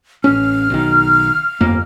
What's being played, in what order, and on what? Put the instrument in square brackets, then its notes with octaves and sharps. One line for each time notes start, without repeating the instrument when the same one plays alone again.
[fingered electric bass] A1 C#4 [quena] F6
[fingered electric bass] B1 D#3
G1 F2 A#3